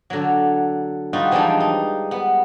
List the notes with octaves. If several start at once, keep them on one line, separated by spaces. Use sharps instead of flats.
D3 F#3
G3 D#4 F4 F#4
E3 F3 G3 G#3 D4 D#4
D#4
B3